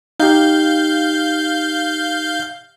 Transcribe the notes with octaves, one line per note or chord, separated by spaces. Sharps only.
D#4 G4 F5 G6